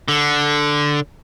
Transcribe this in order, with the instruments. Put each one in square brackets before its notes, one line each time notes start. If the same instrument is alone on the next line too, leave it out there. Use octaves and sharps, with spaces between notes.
[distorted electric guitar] D3